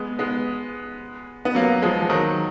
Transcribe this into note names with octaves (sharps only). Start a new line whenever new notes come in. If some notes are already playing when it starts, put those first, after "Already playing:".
Already playing: G#3 B3
G#3 B3
B3
F#3 A#3
F3 G#3
F3
D#3 F#3